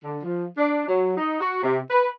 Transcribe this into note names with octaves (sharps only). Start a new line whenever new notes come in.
D3
F3
D4
F#3
D#4
F#4
C3
B4